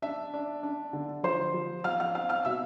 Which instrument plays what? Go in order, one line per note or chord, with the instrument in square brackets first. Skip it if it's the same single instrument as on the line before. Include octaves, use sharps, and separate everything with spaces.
[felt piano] D4 E5
D4
D4
D3
F3 C5 C6
F3
F3 F5 F6
F5 F6
C4 F5 F6
F5 F6
B2 E5 E6